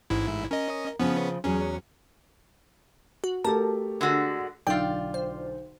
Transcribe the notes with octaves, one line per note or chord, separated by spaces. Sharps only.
A1 G#2 E4
C#4 A#4 D#5
C#3 F3 B3 C#4
E2 F#3 C#4 G#4
F#4
A3 G4 A4 A#4 A5
D3 G#3 F#4
B1 D3 F4 D5 G5
C5